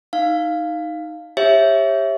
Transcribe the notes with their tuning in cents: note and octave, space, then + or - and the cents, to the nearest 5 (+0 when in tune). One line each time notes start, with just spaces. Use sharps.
D#4 +5 F5 +0
G4 +15 C#5 -25 E5 +0